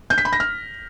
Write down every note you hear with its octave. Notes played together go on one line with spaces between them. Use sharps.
G6
B6
B5
A#6
F6